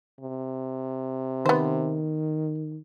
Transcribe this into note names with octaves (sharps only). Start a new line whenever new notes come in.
C3
D#3 B3 C5